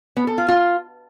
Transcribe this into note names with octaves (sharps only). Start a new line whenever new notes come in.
B3
A4
F4
F4